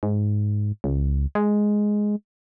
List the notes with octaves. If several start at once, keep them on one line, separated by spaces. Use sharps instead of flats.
G#2
C#2
G#3